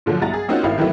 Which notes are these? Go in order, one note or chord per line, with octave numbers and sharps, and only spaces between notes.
A#2 D3 F3 F#3 F4
B1 G2 E4 F#5 A#5 A6
G#4
A#3 C4 C#4 D#4 F4 F#4
G#1 A2 E4 F5
D#3 E3 F#3 A3 B3 E4